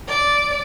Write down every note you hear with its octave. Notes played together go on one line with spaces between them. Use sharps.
D5